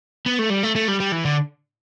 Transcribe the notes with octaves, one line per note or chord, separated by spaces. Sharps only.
B3
A3
G3
A3
A3
G3
G3
E3
D3